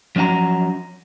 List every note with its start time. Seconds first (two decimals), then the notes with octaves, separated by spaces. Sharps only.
0.16 F3 F#3 C#4 F#5 A#5